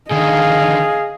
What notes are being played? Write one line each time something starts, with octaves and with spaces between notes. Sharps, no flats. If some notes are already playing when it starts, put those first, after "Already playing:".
D3 D#3 G#4 D#5 F5